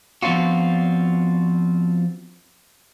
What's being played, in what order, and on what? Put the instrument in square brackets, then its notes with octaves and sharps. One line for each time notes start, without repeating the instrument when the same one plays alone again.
[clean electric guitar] F3 B3 C4 D4 F4 F#4